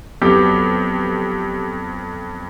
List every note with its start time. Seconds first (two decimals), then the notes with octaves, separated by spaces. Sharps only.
0.22 F2 F#3 B3 C4 G4